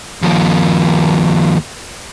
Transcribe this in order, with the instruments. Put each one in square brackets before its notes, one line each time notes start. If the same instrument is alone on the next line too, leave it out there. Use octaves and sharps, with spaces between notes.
[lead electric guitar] D#2 F3